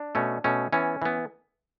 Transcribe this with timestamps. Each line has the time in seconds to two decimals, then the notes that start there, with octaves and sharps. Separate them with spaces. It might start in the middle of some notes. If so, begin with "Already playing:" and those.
Already playing: D4
0.15 B2 A3 C#4
0.44 B2 A3 C#4
0.73 E3 B3 C#4
1.02 E3 B3